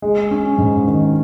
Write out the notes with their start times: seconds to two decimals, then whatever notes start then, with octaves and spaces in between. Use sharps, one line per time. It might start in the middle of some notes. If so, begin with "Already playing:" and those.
0.02 G#3
0.31 C#4
0.58 G#2
0.87 D#3